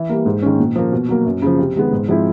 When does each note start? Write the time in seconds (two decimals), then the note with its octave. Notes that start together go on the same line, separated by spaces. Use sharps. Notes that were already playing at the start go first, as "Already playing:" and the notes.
Already playing: E3
0.09 G3 A#3
0.26 G#2
0.42 D#3 G#3 C#4
0.58 A#2
0.76 F3 A#3
0.92 B2
1.09 F#3 A#3
1.26 F#2
1.42 C#3 F3
1.59 C3
1.76 D#3 G#3 B3
1.92 G#2
2.09 F3 G#3 C4 E4